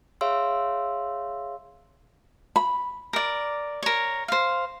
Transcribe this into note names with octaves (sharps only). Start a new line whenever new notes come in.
G#4 C#5 E5 F5 C6 E6
B5
A#4 D5
A#4 C#5
C5 F5